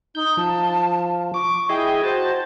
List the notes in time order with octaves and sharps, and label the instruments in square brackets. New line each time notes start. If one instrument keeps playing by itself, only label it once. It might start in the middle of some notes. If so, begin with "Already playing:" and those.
[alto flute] D#4 [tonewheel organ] G6
[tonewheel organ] F3 [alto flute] A5
[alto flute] C#6 [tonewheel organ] D6
[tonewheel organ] E4 G#4 D#5 [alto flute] G5
[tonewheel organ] F#4 A5 [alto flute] C5